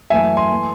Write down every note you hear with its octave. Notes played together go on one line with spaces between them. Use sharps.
F#2 E3 A3 E5 G#5
G#5 C6
E3 A3